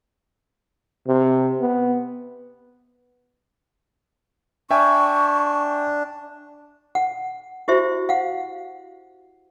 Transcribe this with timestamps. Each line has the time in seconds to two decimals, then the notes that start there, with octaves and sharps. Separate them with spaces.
1.08 C3
1.61 B3
4.71 D4 E5 G5 G#5 C#6
6.95 F#5
7.68 E4 F#4 G4 C5 E5
8.09 F5 F#5